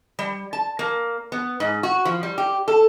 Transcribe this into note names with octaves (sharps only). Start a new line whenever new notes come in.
G3
A5
A#3
B3
G#2
F#4
F3
G3
G4
A4